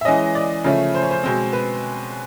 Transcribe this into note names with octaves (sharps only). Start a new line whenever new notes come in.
E5
E3 G#3 C#4 D#5
D5
C#3 F3 A3 C#4
C5
C#5
C5
B2 G#3 C4 C5
B4